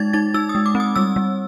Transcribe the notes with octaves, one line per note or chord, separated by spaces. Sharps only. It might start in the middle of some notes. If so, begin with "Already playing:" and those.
Already playing: G#3 D#4 G#6 A6
D#4 A6
D#4 E6
D#6
G#3
D6
C4
D#6
G3 E6
G3